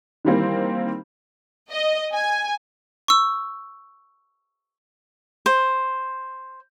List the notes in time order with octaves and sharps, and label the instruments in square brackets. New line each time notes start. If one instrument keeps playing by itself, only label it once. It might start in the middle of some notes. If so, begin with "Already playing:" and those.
[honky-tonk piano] D#3 E3 G3 A#3 C4
[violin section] D#5
G#5
[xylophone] C#6 E6
[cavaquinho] C5